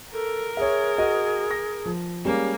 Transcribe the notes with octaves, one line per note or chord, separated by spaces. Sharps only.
A4 A#4
G#4 C#5 E5
F#4 D#5
A#6
F3
G3 G#3 A#3 C#4